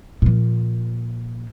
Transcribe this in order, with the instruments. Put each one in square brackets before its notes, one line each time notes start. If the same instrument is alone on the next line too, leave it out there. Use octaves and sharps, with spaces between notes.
[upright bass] A#2 F3